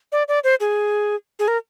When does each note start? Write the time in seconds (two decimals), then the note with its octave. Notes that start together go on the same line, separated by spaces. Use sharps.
0.12 D5
0.28 D5
0.44 C5
0.60 G#4
1.39 G#4
1.48 A#4